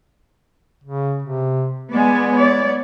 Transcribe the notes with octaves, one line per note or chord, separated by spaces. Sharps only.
C#3
C3
G#3 B3 D5 G#5
C#5 D5